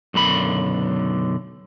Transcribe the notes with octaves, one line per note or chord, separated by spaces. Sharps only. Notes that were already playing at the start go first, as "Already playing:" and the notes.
B1 F#2 D3 B5